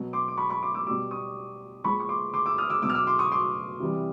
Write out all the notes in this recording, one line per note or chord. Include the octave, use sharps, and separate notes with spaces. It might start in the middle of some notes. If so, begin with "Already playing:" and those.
Already playing: B2 F#3
C6 D6
D6
B5 C#6
B5 C#6
C6 D6
D6 E6
B2 G3 D6 E6
C#6 D#6
A#2 F3 G#3 B5 C#6
C#6
C6 D6
C6 D6
D6 E6
D#6 F6
D6 E6
B2 F#3 D6 E6
F6
D6 E6
C6 D6
C#6 D#6
C6 D6
C3 E3 G3